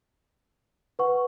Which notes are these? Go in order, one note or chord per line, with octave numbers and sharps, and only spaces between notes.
B4 F#5 C#6